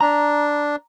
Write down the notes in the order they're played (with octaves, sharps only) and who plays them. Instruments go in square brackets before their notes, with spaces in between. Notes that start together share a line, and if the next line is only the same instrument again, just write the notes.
[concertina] D4 [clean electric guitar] A#5